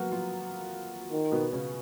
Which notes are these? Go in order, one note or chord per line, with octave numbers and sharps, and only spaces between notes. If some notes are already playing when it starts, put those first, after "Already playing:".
Already playing: F#3 A#3 B3 F#4 A#4
F3 F4
D#3
B2 B3
C#3 C#4